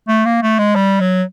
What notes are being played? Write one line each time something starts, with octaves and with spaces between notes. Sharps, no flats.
A3
A#3
A3
G#3
G3
F#3